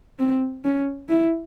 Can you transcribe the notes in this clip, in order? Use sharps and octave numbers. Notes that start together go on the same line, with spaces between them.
C4
C#4
E4